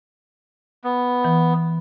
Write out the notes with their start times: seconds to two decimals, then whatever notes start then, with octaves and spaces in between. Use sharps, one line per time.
0.84 B3
1.25 E3